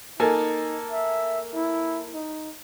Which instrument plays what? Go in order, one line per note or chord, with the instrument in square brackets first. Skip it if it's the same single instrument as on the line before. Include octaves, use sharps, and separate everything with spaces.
[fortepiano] A#3 A4 G#5 [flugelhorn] D#4
[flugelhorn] E5
E4
D#4